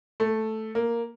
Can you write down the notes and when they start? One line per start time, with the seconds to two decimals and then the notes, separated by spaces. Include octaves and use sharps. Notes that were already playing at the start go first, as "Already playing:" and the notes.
0.20 A3
0.75 A#3